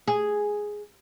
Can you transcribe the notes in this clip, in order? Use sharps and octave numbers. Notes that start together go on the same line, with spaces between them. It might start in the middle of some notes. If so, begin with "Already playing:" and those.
G#4